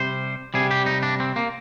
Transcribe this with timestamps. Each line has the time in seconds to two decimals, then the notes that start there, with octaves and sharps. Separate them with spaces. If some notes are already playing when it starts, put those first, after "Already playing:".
Already playing: C3 G3 C5
0.54 C3 G3 G#4
0.71 G4
0.86 D#4
1.03 D4
1.20 C4
1.36 A#3